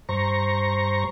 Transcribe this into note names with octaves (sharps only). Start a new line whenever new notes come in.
G2 C5 A#5 C#6